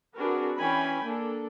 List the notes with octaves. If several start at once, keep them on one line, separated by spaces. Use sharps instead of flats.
C4 D4 F#4 G#4 A#4 B4
E3 C#4 G5 G#5 B5
A#3 D4 A4